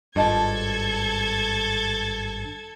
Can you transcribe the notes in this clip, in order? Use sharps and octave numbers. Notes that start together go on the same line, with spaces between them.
G#1 G2 F4 A4 D#5 A5 G#6